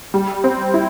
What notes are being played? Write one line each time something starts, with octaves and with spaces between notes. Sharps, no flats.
G3
C4
E4